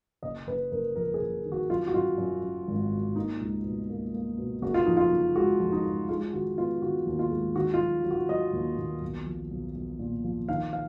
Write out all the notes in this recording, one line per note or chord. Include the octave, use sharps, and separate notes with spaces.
F#1 D#5
F#1 B4
F#1 A#4
F2 A#4
G#4
F#1
D#3
F#4
F#2 F4
F#4
F#2 F4
F#2
F#2
G#1
F#3
A#3 D#4
C#2
B2
A#3
A#3
B2
F#1 F#4
F4
F2 D#4
F4
F#1
G#3 F#4
F2
D#4
G#3
G#3 F4
D#3 F#4
B3 F4
D#3 F#4
D#2
F4
G#3
D#3 F#4
F4
F#3
F#3
F#4
F#3 D#5
D#2
D#2
B1
F3
B1
B1
A#2
F3
D#3 F5
F5